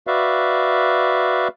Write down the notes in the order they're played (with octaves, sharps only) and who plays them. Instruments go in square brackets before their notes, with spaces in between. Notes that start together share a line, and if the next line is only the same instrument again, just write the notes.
[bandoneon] F#4 B4 D5 E5 F5